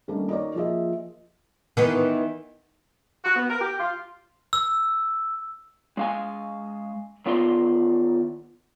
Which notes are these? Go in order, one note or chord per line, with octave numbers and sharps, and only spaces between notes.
D#3 G3 A3 A#3 C#4 D4
D#4 F#4 A#4 C#5 D5
F3 A#3 F4 G#4 D#5 E5
D#3 E3 B3
F#4
B3
A#4
G4
F4
E6
G#3 F5 G#5
D#3 B3 F4 D5 F#5 C6